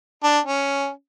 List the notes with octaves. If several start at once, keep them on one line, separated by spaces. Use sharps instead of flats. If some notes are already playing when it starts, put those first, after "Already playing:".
D4
C#4